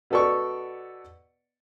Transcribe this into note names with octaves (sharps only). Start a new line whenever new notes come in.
B2 B3 A4 D5 C#6